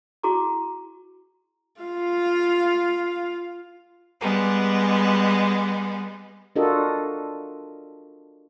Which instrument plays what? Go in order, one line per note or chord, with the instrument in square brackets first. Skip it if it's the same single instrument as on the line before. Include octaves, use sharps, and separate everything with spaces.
[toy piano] E4 F#4 G#4 A#5 C#6 D6
[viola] F4 F5
[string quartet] G3 G#3 B3
[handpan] D4 F4 F#4 A4 A#4 D#5